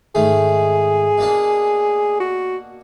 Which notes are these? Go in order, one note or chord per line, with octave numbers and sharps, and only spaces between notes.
G#2 D#3 A3 G#4
B2 A#3 D4
F#4